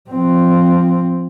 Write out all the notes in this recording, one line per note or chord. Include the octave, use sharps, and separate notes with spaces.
F3 C4